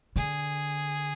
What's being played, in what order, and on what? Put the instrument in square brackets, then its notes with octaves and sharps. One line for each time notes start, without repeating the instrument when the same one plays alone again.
[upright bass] D3 [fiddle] G#4